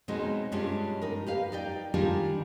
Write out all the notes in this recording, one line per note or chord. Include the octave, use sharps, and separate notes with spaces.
B2 G#3 C4 C#4 D#4
G2 G3 G#3 C#4 D4 F4
D#4 A#4
G4 B4 F5
D#4 D5 G5
D#3 G3 D4 F4 G4 G#4